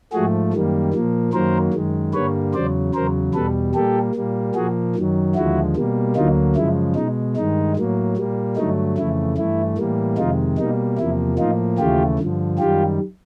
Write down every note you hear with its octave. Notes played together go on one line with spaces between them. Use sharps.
G#2 F3 A3 F#4 G#4
F#2 D#3 G3 A#3
A#2 F3 A#3
F#2 D#3 F#3 A#3 A#4 C5
F#2 D#3 G#3
G2 D3 G3 A#3 B4 C#5
E2 C#3 F#3 C5 D5
E2 C#3 F#3 A#4 C5
E2 B2 G3 A4 B4
A#2 G3 A#3 G4 A4
A#2 G3 A#3
A#2 F3 A#3 F#4 G#4
F#2 D#3 F#3
D#2 D3 F3 G#3 E4 F#4
B2 G3 A#3
D2 D3 F#3 A#3 D#4 F4
F#2 C#3 F3 G#3 E4
B2 G#3 D#4
G2 D#3 G#3 D#4
A2 F#3 A#3
A#2 G3 A#3
G2 D3 F#3 A3 D#4
F2 C#3 E3 A3 E4
G2 E3 A3 E4
A2 E3 G3 A#3
F2 C3 D#3 G#3 D#4 F4
B2 G3 A#3 D#4
E2 C3 F3 A#3 E4
A2 F3 A#3 D#4 F4
D#2 C#3 E3 A3 F4 G4
G2 D3 F3
F#2 D#3 G3 F4 G4